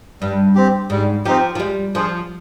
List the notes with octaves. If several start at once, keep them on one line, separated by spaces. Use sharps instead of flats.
G2 G3
C4 G4
G#2 G3
F3 C4 D#4 G4
F3
G3 G#3
F3 D4 G#4 C5